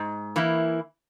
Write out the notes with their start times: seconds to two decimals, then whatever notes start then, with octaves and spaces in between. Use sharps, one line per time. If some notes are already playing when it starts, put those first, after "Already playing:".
Already playing: G#2
0.36 E3 A#3 E4